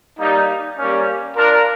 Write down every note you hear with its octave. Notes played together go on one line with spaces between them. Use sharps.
G3 A#3 D#4
G3 A#3 C#4
D4 F4 A#4